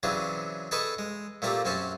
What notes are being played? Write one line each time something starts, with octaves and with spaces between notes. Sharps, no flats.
C#3 E3 F#3 C4 D4 G#4
G#4 A4 B4 D#5 A5 C#6
G#3
A#2 A3 A#3 C4 G4 A#5
F#2 C4 C#4 C5 A5